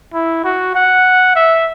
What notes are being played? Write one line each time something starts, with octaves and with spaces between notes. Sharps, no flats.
E4
F#4
F#5
E5